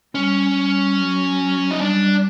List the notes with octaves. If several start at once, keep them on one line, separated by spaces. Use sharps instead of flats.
G3 C#4
G3
F#3
D#4
G3 D4